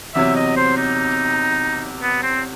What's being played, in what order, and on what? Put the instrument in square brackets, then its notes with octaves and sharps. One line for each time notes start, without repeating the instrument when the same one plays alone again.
[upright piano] E2 C3 F#3 [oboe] E5
[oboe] D#5
C5
D#4
B3
C4